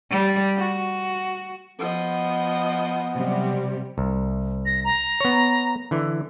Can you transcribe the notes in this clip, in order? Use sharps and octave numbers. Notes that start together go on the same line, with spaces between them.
G3
F#4
F3 B3 D#5
C3 F#3 G3
C2
A#6
A#5
B3 C#5
D3 E3